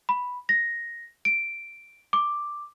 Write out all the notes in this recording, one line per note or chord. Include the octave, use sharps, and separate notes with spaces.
B5
A#6
D7
D6